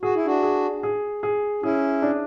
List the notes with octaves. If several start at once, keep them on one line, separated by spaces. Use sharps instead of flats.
F#4 G#4
E4
D4 F#4
G#4
G#4
G#4
C#4 E4 G#4
D4